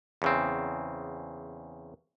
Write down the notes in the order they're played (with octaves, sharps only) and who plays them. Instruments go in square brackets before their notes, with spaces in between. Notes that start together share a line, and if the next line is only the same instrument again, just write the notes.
[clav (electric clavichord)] E2 C#3 C4